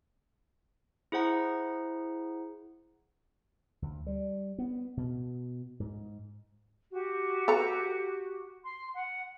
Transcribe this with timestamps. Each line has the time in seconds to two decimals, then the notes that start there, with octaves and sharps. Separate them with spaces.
1.12 E4 G#4 C5 F#5 A#5
3.82 D2
4.07 G3
4.58 B3
4.97 B2
5.80 G#2
6.91 F#4 G4
7.48 A4 B4 A#5
8.63 C6
8.95 F#5